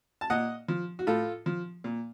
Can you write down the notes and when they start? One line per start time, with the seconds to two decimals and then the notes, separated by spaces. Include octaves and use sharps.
0.21 A5
0.30 A#2 D#5 F#5
0.68 F3
0.99 F#4
1.07 A2 F4 A4
1.46 F3
1.84 A#2